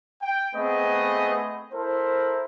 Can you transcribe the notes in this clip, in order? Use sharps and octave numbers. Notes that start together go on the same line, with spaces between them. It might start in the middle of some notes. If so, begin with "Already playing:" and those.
G5
A3 B3 C4 G#4 B4 D#5
E4 A4 A#4 C5